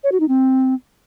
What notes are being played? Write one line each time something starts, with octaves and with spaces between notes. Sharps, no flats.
C#5
F#4
D#4
C4